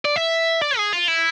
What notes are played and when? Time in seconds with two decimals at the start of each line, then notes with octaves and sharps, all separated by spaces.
0.05 D5
0.16 E5
0.61 D5
0.77 G#4
0.93 F4
1.08 E4